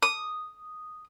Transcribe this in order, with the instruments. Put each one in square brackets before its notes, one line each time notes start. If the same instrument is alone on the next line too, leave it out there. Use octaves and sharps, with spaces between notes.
[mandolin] D#6